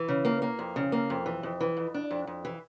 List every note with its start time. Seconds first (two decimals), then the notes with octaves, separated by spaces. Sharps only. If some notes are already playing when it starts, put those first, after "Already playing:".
Already playing: E3
0.08 C#3
0.25 A#3
0.42 A#3
0.59 F2
0.76 C#3
0.92 A#3
1.10 F2
1.26 E3
1.43 F2
1.60 E3
1.77 F2
1.94 D4
2.11 F2
2.27 F2
2.45 E3